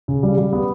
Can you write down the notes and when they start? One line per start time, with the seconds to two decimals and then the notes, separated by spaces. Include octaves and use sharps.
0.08 C#3
0.23 G3
0.38 G3
0.53 B3